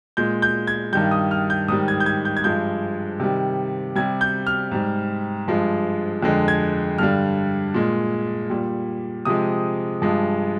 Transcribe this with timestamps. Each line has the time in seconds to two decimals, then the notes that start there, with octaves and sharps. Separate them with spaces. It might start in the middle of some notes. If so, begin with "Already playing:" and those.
0.17 A#2 G#3 G6
0.42 G6
0.67 G#6
0.93 G2 D#3 G3 G6
1.11 D#6
1.31 F6
1.50 G6
1.68 G#2 D#3 G3 D#6
1.88 G#6
2.00 G6
2.06 G#6
2.25 G6
2.37 G#6
2.44 G2 F3 G#3 G6
3.20 C3 D#3 G3
3.95 C3 G3 G#6
4.21 G6
4.47 F6
4.72 G#2 G3
5.48 G2 F3 G#3
6.23 F2 D3 G#3
6.48 G#6
6.98 G2 D3 G3 F6
7.74 A#2 G#3
8.50 A#2 G3
9.25 C3 F3 G#3 D#6
10.02 G2 F3 G#3